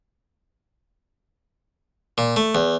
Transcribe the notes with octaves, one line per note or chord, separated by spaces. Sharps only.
A#2
A3
E2